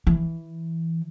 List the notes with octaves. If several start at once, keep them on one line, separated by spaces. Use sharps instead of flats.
E3